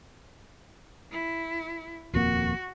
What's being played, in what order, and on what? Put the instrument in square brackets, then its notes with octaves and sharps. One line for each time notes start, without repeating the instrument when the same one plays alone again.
[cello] E4
[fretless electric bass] D#1 F2 A#3 [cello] F#4